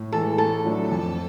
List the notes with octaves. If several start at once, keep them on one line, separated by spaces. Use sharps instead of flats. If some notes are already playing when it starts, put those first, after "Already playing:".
Already playing: A2
E3 G#3 A4
A2 A4
F#3 A3 D4
F2